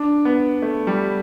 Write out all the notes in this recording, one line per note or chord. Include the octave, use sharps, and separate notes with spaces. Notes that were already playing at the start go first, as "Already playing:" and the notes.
Already playing: D4
B3
A3
G3